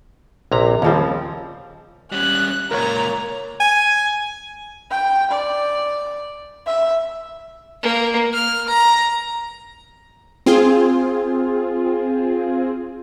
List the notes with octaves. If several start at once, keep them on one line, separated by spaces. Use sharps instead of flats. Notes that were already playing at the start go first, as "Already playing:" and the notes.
A#1 C3 A#5
D#2 C#3 F3 G3 C4
G3 C#4 F#6
C#2 A#2 A#4 C#5 A#5
G#5
G5
D5
E5
A#3
F6
A#5
C4 F4 G#4